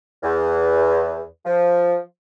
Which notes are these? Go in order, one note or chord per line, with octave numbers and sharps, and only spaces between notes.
E2
F3